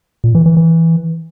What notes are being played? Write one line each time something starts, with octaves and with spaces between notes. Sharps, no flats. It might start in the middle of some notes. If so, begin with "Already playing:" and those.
A#2
E3
E3
E3